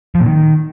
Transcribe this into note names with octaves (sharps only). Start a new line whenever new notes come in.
F3
A#2
D#3